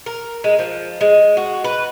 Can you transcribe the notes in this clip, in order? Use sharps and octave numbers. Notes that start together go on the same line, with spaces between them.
A#4
G#3
F3
G#3
F#4
B4